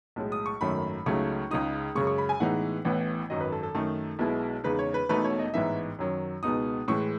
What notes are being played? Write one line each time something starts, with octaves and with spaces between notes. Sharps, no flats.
B1 A2 G#3
D#6
C#6
G#1 F#2 D#3 F#3 A3 B5
C#2 C#3 F#3 A3 D#4 C#6
C#2 C#3 G#3 D#4 D#6
F#2 C#3 G#3 C#6
C#6
B5
G#5
A2 E3 G#3 B3 D#4 F#5
A1 A2 E3 B3
G#1 F#2 D#3 F#3 D#5
B4
A4
A4
F#2 D#3 A3 D#4
B1 B2 G#3 B3 E4
E2 C#3 G#3 D#4 B4
C#5
B4
E1 E2 B2 A3 D#4 B4
C#5
D#5
A1 G#2 E3 B3 D#4 E5
F#2 D#3 F#3
C#2 B2 G#3 B3 D#4 D#6
A2 E3 G#3 C#6